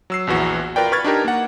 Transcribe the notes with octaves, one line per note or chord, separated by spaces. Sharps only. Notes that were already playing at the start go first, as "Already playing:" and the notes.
F#3 E6 C7
A#1 E2 E3 F#4
F4 A#4 B4 D5 G5
B4 C#6 F6 G#6 A6
D4 D#4 G4 A#4
A#3 F#5